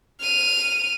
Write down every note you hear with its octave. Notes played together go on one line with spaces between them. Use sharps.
F6 D#7